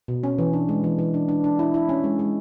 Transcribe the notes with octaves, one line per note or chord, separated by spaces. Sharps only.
B2
C#4
E3
D4
G#3
E3
E3
D4
D4
D4
E4
E4
C#4
G#3
G#3